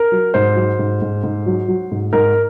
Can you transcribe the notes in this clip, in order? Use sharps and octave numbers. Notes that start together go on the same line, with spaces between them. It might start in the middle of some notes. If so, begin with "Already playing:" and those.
Already playing: A#4
F#3
G#2 C5
F#3
G#2
G#2
G#2
F#3
F#3
G#2
G#2 A#4